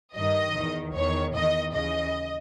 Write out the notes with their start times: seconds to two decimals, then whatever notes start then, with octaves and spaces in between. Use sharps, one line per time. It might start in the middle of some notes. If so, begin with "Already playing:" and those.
0.15 G2 D#3 D#5
0.55 E2 D#3
0.95 E2 D#3 C#5
1.35 E2 D#3 D#5
1.74 D#2 C#3 E3 D#5